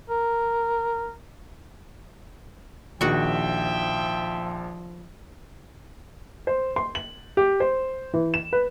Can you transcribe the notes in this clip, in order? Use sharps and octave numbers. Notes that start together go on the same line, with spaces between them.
A#4
A#1 D#3 F3 F#4 E5 G5 C#6
C5
C6
F#7
G4
C5
E3
E7
B4